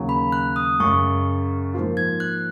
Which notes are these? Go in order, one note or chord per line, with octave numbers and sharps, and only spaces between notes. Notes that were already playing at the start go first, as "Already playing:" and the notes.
Already playing: D#2 C#3 F#3
B5
F#6
D#6
F#2 C#3 G#3 C#6
G#2 F3 A#3 F4
G#6
F#6